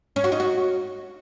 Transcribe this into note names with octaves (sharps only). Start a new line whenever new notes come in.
C#4
F#4
D#4
F#4